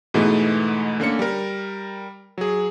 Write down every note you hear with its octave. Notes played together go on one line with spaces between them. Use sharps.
G#2 B2 E3 G#3 A3 B3
D3 A#3 C#4 C#7
G3 A#4
F#3 G#4